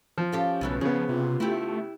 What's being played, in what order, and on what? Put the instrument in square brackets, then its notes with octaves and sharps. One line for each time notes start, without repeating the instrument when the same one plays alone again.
[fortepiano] F3
[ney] C#4 [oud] G4 A4 F5
[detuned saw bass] B1 [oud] C#3 A3 B3
[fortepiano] C#3 B3 [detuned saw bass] F3 [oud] G#4
[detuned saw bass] C3 [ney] F4
[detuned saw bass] A3 [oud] E4 G4